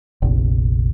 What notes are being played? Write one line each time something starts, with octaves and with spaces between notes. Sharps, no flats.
F1 A#1